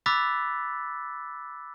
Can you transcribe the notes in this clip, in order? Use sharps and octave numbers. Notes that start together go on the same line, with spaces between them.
B5 D6 E6 F#6 A6 B6